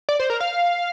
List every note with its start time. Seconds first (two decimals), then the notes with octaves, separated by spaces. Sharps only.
0.09 D5
0.20 C5
0.30 A#4
0.40 F5